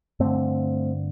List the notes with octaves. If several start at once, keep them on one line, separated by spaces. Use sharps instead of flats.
G2 D3 A3 C4